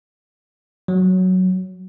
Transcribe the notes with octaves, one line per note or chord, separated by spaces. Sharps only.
F#3